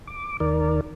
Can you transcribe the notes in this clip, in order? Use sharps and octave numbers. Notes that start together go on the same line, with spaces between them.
D6
D#2 D#3 A#4 D5